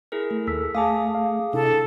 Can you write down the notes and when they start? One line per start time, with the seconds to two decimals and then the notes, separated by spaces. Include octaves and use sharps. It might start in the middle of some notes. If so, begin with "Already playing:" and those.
0.12 E4 G#4 A#4
0.31 A3
0.47 D#2 A4 E6 B6
0.75 A3 G#4 F5 G#5 A5 D6 D#6
1.15 F5
1.53 C3 D4 E4 A4